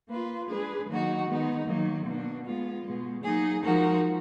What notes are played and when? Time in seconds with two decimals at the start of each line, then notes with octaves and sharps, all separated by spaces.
0.09 A#3 F4 B4
0.48 G#3 D4 G#4 B4
0.88 D#3 F#3 A#3 D#4 F#4
1.27 D#3 G#3 B3 D#4
1.67 D#3 F#3 A#3
2.05 B2 A#3 D4
2.45 G#3 B3 F4
2.84 B2 G#3 B3
3.23 F#3 A#3 D#4 G#4
3.63 F3 G#3 D#4 F#4 A#4